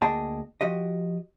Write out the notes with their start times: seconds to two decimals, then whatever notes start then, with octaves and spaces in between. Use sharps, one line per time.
0.02 D2 A#3 G#4 D#5 G5 A5
0.61 F3 F#4 G4 D#5